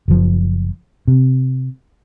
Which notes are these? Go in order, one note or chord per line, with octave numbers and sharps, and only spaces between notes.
F#1 F3
C3